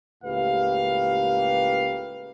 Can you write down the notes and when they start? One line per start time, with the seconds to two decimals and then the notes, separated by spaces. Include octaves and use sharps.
0.24 C#2 A2 A#3 G4 B4 F5